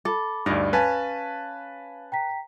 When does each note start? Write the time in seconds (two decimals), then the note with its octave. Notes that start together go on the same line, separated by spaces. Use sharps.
0.05 A4 B5 D6
0.46 D2 G2 D#4 D5
0.73 C#4 B4 F5 G#5 A5
2.12 G5 A#5 B6